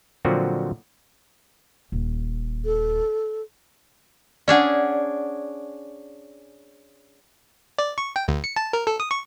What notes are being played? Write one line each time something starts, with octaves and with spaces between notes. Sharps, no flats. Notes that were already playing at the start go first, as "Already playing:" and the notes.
A#2 D3 F3 F#3 C4 F#4
D#1
A4
C#4 D4 G#4 D5 F#5
D5
C#6
G5
D2
C#7
A5
A#4
A4
D#6
C#6